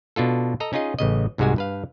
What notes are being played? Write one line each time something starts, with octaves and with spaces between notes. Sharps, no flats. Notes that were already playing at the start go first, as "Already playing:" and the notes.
B2 D4 F4 A4
A4 D#5 A#5
C#4 D#4 F4 G#4 D#5
A1 C#3 D#5
C2 G#2 C3 G#3 F#4 G#5
G2 B4 F5